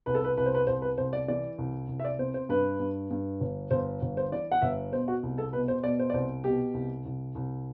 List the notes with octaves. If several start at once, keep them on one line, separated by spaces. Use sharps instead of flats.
C2 B4
A4
B4
C2 B4
C5
B4
C2 C5
B4
C2 C5
D5
E3 D5
C2
C2
E5
D5
C3 C5
C5
G2 B4
G2
G2
G1
G1 C5
G1
C5
E3 D5
F#5
G1 E5
B2 C5
F#4
C2
A4
B2 B4
C5
B2 D5
C5
D5
C2 C5
B2 G4
C2
C2
C2